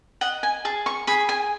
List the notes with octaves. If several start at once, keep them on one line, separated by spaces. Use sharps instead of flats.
D#5 F#5
G#5
G#4 A5
C#6
G#4 B5
G#5